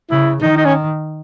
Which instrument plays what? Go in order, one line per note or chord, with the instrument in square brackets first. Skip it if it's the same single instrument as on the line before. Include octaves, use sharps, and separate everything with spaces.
[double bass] C#3 [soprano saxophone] E4
[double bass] D#3 [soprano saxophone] D#4
[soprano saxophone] D#4
C#4